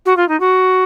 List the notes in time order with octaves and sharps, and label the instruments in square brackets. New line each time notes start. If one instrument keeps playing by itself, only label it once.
[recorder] F#4
F4
D#4
F#4